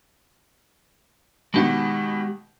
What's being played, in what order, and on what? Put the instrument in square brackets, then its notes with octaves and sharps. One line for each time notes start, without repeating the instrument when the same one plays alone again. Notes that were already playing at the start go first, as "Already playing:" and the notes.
[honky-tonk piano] B2 D#3 [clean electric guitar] G#3 G4 F#5